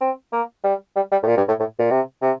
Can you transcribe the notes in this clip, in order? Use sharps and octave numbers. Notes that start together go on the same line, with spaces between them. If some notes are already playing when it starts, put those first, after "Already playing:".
C4
A#3
G3
G3
G3
A2
A#2
G2
A2
A2
A#2
C3
C3